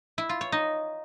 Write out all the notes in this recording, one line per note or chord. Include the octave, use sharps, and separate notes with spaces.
E4
F4
C#5
D#4